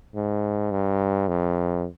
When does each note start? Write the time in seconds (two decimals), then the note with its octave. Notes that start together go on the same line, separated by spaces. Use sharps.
0.15 G#2
0.71 G2
1.28 F2